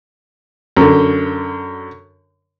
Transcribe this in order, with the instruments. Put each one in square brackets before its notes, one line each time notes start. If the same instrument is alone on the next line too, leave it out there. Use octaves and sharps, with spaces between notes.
[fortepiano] F#2 D3